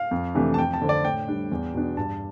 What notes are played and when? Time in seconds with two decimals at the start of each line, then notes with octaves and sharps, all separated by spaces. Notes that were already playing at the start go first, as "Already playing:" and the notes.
Already playing: F5
0.11 F2
0.35 C3 E3 A3 D4
0.54 A5
0.58 F2 G5
0.74 A5
0.82 D3 A3 C4
0.89 D5
1.05 A2 G5
1.28 G3 D4
1.51 E2
1.74 B2 B3 D4
1.97 G2 A5